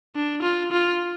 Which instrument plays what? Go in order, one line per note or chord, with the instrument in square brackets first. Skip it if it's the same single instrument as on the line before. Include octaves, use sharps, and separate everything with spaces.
[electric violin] D4
F4
F4